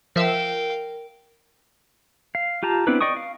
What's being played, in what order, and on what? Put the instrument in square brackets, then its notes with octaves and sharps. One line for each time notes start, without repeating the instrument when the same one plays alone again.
[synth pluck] F3 E5 E6 [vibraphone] A#4 [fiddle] F5 G5
[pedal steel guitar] F5
F4 G4 A5 A#5
B3 C4 D4 E4 B4
D5 D#5 G5 C#6 D#6
F5